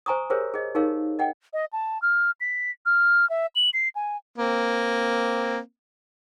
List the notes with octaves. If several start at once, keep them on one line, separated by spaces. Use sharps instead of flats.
C5 G#5 A#5 C#6 D#6
G4 G#4 A#4 C5 C#5 E5
G#4 D#5
D#4 G4 G#4 A#4 C#5 F5
D#5 F#5 G5
D#5
A5
F6
B6
F6
E5
F#7
C7
G#5
A#3 C4